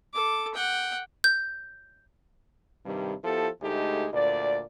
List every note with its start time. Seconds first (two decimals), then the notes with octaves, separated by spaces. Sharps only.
0.13 A4 D6
0.54 F#5 G5
1.24 G6
2.85 G2 C3 D#3 G3
3.24 F3 B3 E4 G4 A4
3.62 D2 G#3 A3 D#4 G4
4.13 D2 A#2 D5